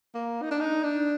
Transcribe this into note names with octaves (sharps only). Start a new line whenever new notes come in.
A#3
D#4
D4
D#4
D4